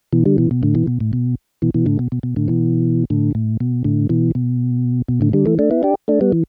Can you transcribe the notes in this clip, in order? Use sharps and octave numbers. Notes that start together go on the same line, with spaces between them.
B2 E3
D3 G3
B2 E3
B2
A2 D3
B2 E3
B2
A2
B2
B2 E3
B2 E3
A2 D3
B2
B2
B2
A2 D3
B2 E3
A2 D3
A2
B2
A2 D3
B2 E3
B2
B2
A2 D3
D3 G3
E3 A3
A3 D4
B3 E4
D4 G4
A3 D4
G3 B3
E3